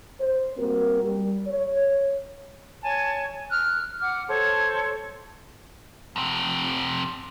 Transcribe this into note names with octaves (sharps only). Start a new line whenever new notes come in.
C5
G3 A#3 C4 F#4 A#4
G3
C#5
C#5 G#5 A5
F6 F#6
F#5 D6 F6
A4 C5 C#5
F2 C3